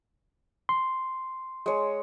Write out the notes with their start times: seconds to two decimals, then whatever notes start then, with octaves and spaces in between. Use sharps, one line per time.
0.69 C6
1.66 G#3 C#5